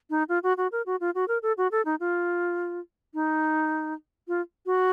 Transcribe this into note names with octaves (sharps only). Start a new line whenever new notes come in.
D#4
F4
F#4
F#4
A#4
F#4
F4
F#4
A#4
A4
F#4
A4
D#4
F4
D#4
F4
F#4